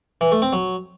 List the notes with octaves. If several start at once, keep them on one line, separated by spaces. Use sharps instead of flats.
E3
A3
C4
F#3